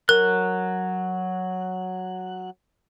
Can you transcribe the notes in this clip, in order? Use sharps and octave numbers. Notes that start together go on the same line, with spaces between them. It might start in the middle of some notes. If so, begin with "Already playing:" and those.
F#3 A#4 F#6